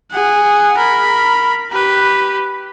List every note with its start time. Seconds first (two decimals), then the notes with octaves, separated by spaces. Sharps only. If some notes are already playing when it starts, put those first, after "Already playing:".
0.11 G#4 F#5
0.78 A#4 B5
1.71 G4 B4